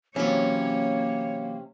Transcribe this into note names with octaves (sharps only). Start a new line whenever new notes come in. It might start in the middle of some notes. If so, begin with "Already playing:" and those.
C3 E3 F#3 A#3 C#4 C#5